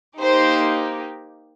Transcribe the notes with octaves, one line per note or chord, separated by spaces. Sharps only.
A#3 D#4 G4 C5